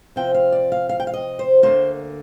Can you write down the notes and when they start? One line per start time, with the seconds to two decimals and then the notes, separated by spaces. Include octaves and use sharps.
0.16 C3 F3 C4 F4 G5
0.34 F5
0.52 D5
0.72 F5
0.89 F5
1.00 G5
1.07 F5
1.14 D#5
1.39 C5
1.63 D2 D3 F3 A#3 C5